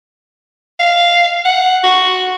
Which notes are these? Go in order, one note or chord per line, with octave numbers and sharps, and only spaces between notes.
F5
F#5
F#4